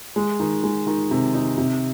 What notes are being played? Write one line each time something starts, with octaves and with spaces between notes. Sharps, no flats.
G#3
D#3
G#3
D#3
C3
D#4
C3